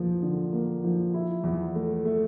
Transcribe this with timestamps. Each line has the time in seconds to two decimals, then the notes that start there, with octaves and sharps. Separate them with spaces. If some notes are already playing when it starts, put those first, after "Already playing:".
Already playing: E2 F3 A#3
0.22 D3
0.53 A#3
0.84 F3
1.14 E4
1.44 E2
1.75 A3
2.05 A3